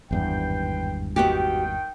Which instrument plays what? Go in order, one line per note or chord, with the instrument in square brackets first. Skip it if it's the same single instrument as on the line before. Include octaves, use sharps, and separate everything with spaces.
[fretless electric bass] G#1 E2 G2 [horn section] B4 C5 G5
[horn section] D#3 G5 [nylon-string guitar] B3 F#4 G4